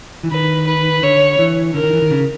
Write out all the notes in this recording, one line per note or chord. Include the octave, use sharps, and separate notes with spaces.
E3
D#3 B4
B4
D3 C#5
E3
D3 A#4
D#3
E3
D#3
C#3